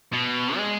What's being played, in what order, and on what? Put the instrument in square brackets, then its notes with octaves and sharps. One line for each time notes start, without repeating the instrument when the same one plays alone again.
[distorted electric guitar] B2
G#3